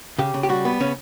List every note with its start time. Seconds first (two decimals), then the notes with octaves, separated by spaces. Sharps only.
0.19 C#3 G4
0.34 C#3
0.43 G4
0.49 G3 F#4
0.65 B3
0.80 C#3 C#4